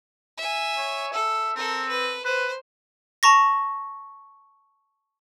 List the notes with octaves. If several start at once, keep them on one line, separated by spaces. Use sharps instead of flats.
E5 G#5
C#5
A4 E5
C4 A4 A#4
B4
B4 C5
A5 A#5 C#6 A#6